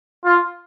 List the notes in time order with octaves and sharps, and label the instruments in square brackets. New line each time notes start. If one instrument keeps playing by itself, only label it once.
[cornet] F4